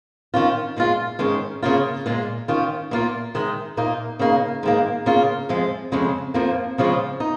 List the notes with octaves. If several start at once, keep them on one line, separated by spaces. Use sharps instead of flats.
D#3 C#4 F4
A#2 G#3 F4
G#2 D#3 G#3 C#4
C#3 A#3 F4
A#2 G#3 F4
D#3 C#4 F4
A#2 A#3 F4
D#3 G#3 D#4
A#2 A#3 D#4
C#3 A#3 D#4
G#2 D#3 A#3
C#3 A#3 F4
F2 F3 G#3
F2 C#3 G#3
F2 F3 A#3
C#3 F3 G#3 C#4 F4
D#4